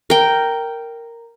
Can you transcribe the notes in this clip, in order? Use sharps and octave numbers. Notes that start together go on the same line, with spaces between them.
A#4 G5